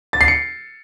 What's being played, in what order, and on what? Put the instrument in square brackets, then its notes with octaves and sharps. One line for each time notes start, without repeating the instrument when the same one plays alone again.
[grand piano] A6
C7
C#7